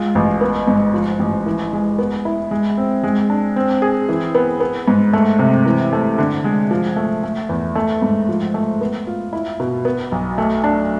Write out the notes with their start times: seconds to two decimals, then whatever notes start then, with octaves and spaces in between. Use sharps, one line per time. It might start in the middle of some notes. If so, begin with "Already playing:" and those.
Already playing: G#3 F4
0.15 A1
0.41 B3
0.67 G#2
0.94 F3
1.20 A1
1.46 E3
1.73 G#3
1.99 B3
2.25 E4
2.51 G#3
2.77 C4
3.04 G#3
3.30 D4
3.56 C4
3.82 G#4
4.09 E3
4.35 B3
4.60 B3
4.88 G#2
5.13 A3
5.39 C3
5.66 E3
5.93 A3
6.18 D3
6.44 G#3
6.71 F3
6.96 A3
7.23 A3
7.49 E2
7.76 A3
8.02 G#2
8.29 F3
8.54 A3
8.81 B3
9.07 F4
9.33 E4
9.60 B2
9.85 B3
10.12 B1
10.38 A3
10.64 D4